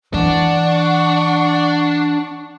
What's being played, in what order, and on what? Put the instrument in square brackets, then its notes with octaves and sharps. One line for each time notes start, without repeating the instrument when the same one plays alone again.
[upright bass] E3 [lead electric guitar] D4 [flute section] F#5 C#6